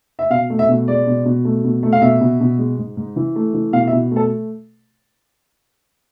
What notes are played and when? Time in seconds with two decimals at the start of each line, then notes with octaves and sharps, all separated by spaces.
0.19 E5
0.30 B2 F5
0.50 A3
0.59 E5
0.69 B2
0.88 G#3 D5
1.07 B2
1.25 B2
1.45 A3
1.64 B2
1.83 A3
1.93 F5
2.02 B2 E5
2.21 B2
2.40 B2
2.58 G#3
2.78 G#2
2.97 G#2
3.16 E3
3.36 A3
3.54 E3
3.73 B2 F5
3.87 E5
3.92 B2
4.11 A3
4.16 A4